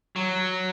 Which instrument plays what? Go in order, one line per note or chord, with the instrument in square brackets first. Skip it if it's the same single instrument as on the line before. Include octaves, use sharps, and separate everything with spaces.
[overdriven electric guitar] F#3